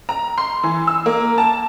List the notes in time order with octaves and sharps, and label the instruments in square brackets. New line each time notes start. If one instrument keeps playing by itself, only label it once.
[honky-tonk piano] A#5
C6
E3
E6
A#3
A5